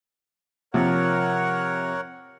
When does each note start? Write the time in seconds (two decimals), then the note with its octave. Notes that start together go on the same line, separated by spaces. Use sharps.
0.74 C3 F3 A#4 C#5 F#5